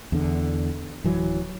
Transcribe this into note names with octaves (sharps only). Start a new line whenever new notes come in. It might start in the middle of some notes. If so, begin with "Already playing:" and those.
E2 D3
D1 E3 F#3